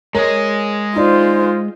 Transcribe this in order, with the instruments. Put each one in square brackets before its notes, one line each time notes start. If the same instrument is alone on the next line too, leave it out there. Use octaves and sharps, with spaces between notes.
[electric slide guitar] G#3 D#5 [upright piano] A#4 C#5
[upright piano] D#4 D5 [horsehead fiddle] F4 C5